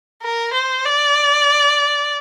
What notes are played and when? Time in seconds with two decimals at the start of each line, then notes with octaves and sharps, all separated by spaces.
0.22 A#4
0.54 C5
0.85 D5